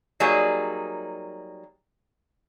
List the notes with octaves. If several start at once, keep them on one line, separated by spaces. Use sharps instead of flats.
F#3 G3 A#3 D#4 G#4